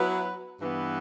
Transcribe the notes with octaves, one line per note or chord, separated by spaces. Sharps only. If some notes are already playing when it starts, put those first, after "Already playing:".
Already playing: F#3 B3 E4 B4
G2 E3 B3